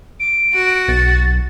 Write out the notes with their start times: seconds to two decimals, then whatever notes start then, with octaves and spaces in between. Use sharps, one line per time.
0.20 D7
0.54 F#4
0.88 B1 A6